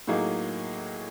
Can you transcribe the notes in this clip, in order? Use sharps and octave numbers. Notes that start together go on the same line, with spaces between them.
A2 F#3 A#3 D#4 G#4